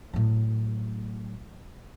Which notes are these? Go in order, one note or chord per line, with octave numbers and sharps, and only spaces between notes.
A2 F#3